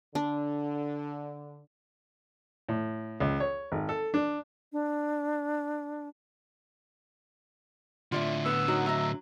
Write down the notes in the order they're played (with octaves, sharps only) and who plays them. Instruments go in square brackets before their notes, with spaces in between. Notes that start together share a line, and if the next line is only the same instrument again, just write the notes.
[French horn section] D3 [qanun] D4
[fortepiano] A2
C#2
C#5
G#1
A4
D4
[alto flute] D4
[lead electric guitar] A2 D3 [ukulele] F4 D5 E5
[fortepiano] B3 [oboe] E6
[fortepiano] F#3 [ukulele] D#4 A#4 F#5
[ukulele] D#5 A#5 [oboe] E5